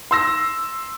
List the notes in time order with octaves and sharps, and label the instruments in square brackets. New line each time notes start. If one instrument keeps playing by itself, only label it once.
[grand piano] C6 E6 A#6